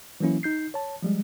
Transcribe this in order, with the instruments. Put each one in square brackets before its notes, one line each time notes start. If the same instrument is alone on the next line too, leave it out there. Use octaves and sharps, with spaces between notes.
[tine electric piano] E3 F#3 A#3 C#4 E4
D#4 G6 C7
C#5 A5
F3 G3 G#3